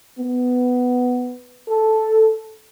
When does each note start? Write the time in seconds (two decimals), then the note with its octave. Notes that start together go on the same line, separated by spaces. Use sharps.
0.19 B3
1.69 A4